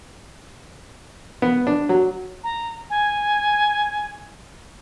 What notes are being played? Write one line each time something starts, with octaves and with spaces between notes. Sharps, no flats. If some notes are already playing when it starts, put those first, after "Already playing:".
B3
D4
F#3
A#5
G#5